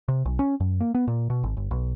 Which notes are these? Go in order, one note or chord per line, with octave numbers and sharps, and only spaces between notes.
C3
B1
C#4
F#2
A#3
B3
A#2
B2
G#1
G1
B1